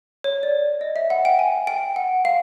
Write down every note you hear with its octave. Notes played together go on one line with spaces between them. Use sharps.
C#5
D5
D#5
E5
F#5
G5
G#5
G5
F#5
F5